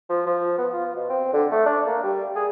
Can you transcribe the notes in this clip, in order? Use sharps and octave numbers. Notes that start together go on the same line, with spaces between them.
F3
F3
B3
F4
B2
C4
D3
A3
D4
A#3
G3
G#4